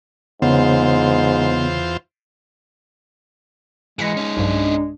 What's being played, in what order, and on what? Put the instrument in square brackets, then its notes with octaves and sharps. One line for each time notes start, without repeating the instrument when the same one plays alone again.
[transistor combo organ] E2 F4 C5 [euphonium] G#2 [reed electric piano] C#3 C#5 [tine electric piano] B3
[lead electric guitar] G#2 E3 [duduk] G#3 [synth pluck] A#6 C#7
[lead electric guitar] C#4 D#4
[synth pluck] B1 G2 [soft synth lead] D4